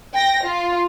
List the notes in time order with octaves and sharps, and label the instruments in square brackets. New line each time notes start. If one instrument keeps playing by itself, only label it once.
[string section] G5 A#6
F4